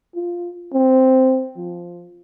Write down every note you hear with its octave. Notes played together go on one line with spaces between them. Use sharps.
F4
C4
F3